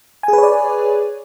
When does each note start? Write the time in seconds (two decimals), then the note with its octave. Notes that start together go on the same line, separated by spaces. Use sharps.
0.23 G#5
0.28 G#4
0.33 B4
0.38 C#5
0.43 D5